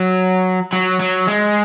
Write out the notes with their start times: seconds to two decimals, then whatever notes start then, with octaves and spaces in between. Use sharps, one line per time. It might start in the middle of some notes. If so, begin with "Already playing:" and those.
Already playing: F#3
0.73 F#3
1.00 F#3
1.27 G#3